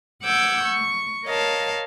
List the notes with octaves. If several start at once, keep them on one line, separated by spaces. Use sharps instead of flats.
F#5 D6 E6 G6 G#6
C#6
A#4 C#5 D#5 F5 A5